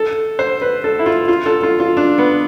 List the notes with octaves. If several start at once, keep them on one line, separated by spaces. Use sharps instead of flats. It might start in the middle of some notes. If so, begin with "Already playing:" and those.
Already playing: A4
C5
B4
A4
E4
F4
F4
A4
F4
F4
D4
B3